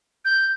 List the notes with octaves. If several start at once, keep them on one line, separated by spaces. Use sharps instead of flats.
G6